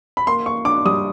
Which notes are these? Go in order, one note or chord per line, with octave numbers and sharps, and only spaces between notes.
B5
A#3 C6
A#3 C#6
D4 D6
G3 D#6